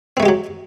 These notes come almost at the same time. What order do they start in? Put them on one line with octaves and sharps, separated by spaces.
C4 A3 G#3 G4 F#3